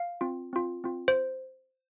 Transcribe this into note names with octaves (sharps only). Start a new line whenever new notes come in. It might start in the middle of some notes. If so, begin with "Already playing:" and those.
Already playing: F5
C4 F4
C4 F4
C4 F4
C5